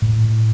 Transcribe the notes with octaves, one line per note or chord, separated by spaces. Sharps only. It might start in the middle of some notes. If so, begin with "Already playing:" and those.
A2